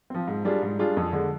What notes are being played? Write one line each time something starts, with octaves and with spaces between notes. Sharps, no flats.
F3 C4
G#2
G3 D4 F4 G#4
G#2
G3 D4 F4 G#4
F2
D3 G#3